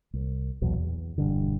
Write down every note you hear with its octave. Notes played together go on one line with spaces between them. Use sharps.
C2
B1 E2 A#2 F#3
E2
E1 G2 D3